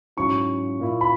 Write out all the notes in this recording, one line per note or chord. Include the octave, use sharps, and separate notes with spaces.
G#2 F#3 C#4 E4 C#6
A#2 A#3 E4
B5